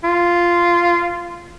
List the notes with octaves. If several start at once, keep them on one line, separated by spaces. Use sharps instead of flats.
F4